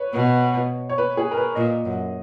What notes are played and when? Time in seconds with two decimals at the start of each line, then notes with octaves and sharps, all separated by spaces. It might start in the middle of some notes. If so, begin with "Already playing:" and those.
Already playing: B4 C#5
0.13 B2
0.90 C#5
0.98 B4
1.17 G#4
1.31 A#4
1.37 B4
1.55 A#2 D#5
1.85 F#2